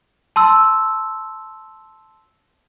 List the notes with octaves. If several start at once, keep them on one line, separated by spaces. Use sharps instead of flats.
A5 C6 E6